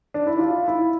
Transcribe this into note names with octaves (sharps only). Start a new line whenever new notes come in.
D4
E4
F4
E4